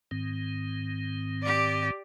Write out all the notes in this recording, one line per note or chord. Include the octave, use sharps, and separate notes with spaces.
G#2 D#3 C4
G4 D5